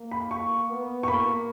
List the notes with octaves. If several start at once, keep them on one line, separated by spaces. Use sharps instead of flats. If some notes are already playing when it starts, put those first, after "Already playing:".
Already playing: A#3
B5
C#6
B3
C#6
A#3 B5